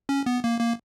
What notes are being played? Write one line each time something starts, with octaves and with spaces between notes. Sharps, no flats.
C#4
B3
A#3
A#3